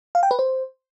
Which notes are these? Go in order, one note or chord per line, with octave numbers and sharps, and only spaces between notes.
F5
G5
B4
C5